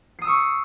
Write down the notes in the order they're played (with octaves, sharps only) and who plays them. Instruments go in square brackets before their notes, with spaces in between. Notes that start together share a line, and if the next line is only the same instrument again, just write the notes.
[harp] C7
D#6
E6
C#6